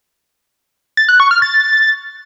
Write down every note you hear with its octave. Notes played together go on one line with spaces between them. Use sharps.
A6
F#6
C#6
F6
A6